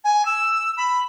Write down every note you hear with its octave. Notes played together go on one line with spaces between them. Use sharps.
G#5
E6
B5